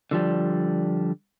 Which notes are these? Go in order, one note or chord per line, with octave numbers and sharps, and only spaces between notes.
D3 F3 G3